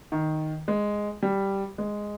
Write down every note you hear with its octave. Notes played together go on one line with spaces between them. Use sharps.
D#3
G#3
G3
G#3